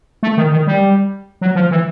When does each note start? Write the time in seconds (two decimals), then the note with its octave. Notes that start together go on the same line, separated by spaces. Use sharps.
0.23 A3
0.37 D#3
0.52 D#3
0.67 G3
1.41 F#3
1.55 F3
1.71 E3